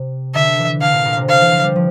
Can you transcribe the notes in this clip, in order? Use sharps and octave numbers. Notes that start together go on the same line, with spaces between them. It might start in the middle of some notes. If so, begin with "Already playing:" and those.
Already playing: C3
D3 E5
E3
D3 F5
A#2
A#2
C3
D3 F5
E3
F3
G3
F3